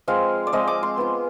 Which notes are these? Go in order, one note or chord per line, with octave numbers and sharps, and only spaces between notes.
F3 G#3 C4 F5
D5
F3 G#3 C4 D#5
D6
C6
B3 F4